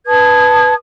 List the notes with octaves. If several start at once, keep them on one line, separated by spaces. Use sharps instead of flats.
B4 A5 D#6 G#6